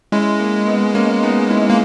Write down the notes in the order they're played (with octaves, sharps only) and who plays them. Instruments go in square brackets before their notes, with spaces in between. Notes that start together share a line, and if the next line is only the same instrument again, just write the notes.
[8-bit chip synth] G#3 [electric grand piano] C#4 E4
[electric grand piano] A#3
B3
A#3 C#4
B3 D#4
C#4 E4
[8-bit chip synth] A#3